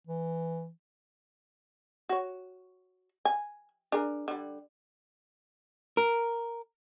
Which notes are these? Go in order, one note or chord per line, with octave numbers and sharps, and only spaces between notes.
E3
F#4 C#5
G#5
D4 G#4 A#4
D3 G3
A#4